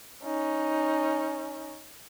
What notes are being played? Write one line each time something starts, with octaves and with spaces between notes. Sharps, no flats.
C#4 D#4